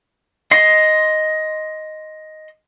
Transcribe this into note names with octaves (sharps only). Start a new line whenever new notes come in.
D#5 C6